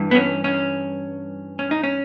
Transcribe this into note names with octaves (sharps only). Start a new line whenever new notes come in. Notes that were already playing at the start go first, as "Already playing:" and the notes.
Already playing: G2 E3
B3
C#4
C#4
C#4
D#4
C#4